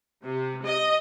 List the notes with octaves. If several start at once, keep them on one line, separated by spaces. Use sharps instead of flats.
C3
D#5